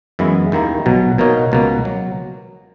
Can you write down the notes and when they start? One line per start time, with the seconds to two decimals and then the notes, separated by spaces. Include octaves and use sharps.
0.19 F#2 E3 G#3 B3 E4
0.52 D#2 D#3 A#3 E4
0.86 B1 B2 F#3
1.18 B2 A#3 D#4 A#4 C#5
1.52 C#2 B2 A#3
1.85 F#3